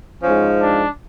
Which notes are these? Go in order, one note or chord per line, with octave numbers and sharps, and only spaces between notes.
F3 C#4
G#2
D4